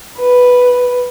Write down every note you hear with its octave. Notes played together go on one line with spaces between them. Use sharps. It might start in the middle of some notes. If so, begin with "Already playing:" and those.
B4